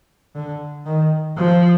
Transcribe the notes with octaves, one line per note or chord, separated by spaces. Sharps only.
D3
D#3
F3